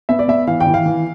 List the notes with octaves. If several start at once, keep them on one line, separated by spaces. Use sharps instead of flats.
B3 E5
D5
B3 E5
E3 F5
G5
E3
F5
E3